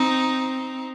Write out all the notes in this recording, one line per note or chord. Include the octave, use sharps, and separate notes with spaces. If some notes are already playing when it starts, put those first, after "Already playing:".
Already playing: C4 D#4